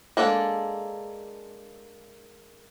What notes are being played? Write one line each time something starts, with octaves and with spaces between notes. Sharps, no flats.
G#3 A#3 D4 A4